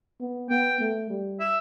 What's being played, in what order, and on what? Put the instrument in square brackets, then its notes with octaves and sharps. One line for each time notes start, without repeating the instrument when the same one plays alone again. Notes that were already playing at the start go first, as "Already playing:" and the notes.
[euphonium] B3
[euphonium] B3 [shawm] G5
[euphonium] A3
G3
[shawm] E5